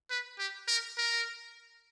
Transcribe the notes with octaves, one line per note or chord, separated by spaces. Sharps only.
B4
G4
A#4
A#4